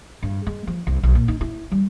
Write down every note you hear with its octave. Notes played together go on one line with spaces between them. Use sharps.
G2
G#3
F3
C2
B1
A#2
D#4
E4
G3